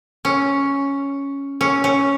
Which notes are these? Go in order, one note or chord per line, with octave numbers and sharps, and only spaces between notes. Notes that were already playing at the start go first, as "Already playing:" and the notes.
C#4
C#4
C#4